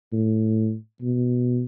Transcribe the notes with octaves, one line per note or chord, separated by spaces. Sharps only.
A2
B2